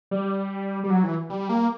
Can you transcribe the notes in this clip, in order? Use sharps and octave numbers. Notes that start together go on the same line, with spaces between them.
G3
G3
F#3
E3
G3
A#3